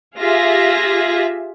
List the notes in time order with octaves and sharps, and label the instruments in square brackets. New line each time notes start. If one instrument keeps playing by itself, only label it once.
[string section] F4 G4 G#4 E5 A#6